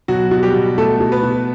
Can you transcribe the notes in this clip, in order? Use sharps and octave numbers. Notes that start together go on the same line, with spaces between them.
B2 F#3 F#4
B2
G3 G4
B2
B2 A3 A4
B2
B3 B4
B2